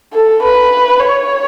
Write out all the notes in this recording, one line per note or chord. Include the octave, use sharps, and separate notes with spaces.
A4
B4
C#5